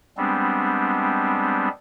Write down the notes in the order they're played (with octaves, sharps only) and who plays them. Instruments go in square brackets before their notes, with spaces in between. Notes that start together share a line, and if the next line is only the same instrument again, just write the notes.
[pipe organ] G3 G#3 B3 C4 D4